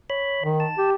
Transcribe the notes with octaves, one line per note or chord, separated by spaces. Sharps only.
C#5 B5
D#3
A5
G4